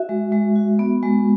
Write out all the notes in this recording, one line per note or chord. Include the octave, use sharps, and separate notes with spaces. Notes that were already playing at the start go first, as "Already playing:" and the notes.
Already playing: F#4 E5
G#3
G#3
F#4
B3
G#3